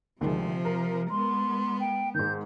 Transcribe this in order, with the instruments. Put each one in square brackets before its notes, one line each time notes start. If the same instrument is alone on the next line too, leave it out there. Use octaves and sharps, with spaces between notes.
[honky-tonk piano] D2 D#3 G#3 [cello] C3 F3
[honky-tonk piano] A#4
[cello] G#3 B3 [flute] C6
[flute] G5
[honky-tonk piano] G#2 D#3 [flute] G6